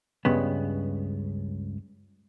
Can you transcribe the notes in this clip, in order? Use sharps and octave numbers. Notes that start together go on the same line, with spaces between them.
C#2 G2 C#3 B3